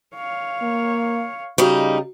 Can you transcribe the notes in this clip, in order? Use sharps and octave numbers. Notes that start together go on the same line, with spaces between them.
C#5 F5
A#3
C#3 G3 A#3 D#4 F#4